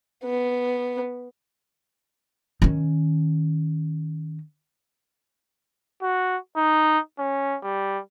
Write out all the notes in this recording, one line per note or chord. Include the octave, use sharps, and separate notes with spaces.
B3
D#3 C#4
F#4
D#4
C#4
G3